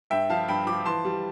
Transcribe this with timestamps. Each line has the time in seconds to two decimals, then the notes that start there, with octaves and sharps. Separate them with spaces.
0.10 G2 E5 G5
0.30 F3 F5 A5
0.48 G2 G5 B5
0.67 F3 B5 D6
0.85 E3 A5 C6
1.05 G3